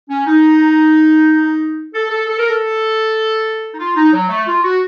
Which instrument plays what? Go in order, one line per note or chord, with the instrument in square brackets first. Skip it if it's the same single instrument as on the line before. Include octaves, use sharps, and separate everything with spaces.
[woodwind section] C#4
D#4
A4
A4
A4
A#4
A4
D#4
F4
D#4
F#3
A3
F4
F#4